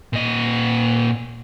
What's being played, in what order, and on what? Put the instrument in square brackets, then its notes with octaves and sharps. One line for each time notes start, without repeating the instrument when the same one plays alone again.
[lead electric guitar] A#2 D#5